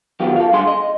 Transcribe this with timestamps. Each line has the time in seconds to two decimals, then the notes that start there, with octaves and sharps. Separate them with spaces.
0.20 D#3 F#3 B3 F4 G4
0.36 A4 F5
0.53 G2 G#4 C6
0.67 D#5